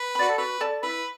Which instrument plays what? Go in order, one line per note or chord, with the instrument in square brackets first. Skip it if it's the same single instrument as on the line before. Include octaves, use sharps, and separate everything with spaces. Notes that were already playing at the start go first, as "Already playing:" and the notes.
Already playing: [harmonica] B4
[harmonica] F#4 [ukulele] D5 B5
[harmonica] A4
[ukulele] F#4 [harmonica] B4
[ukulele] A4 D5 A5
[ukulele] E4 [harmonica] B4